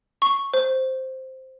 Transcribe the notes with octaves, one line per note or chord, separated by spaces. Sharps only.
C#6
C5